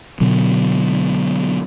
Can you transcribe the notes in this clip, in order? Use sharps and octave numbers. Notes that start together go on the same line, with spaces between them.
B2 D3 F#3